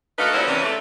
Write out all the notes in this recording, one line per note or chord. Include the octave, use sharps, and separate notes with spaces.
A3 D4 D#4 F#4 B4 F5
D#2 F#3 C#4 E4 C5 D5
C3 E3 C#4
A3